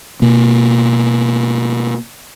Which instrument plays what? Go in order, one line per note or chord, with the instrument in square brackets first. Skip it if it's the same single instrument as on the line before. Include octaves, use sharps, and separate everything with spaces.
[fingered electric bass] B2 A#3